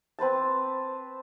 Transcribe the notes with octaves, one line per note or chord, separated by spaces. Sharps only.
C4 B4 C5 A5